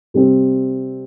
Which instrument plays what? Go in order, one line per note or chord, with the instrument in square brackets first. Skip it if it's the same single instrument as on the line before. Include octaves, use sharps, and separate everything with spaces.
[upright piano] C3 G3 C4